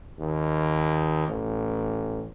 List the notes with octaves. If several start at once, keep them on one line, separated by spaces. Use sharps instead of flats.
D#2
A1